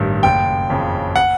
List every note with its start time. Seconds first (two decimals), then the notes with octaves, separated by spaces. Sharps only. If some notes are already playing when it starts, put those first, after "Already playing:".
Already playing: A1 G2 D#3
0.23 F#1 G5
0.70 F2 C#3
1.16 F#5